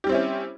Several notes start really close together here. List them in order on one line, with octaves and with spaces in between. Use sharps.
G4 G3 C4 E4 C#4